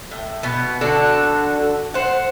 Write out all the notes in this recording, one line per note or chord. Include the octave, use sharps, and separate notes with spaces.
A2
B2 B3
D3 D4 F#4 A4
C5 F#5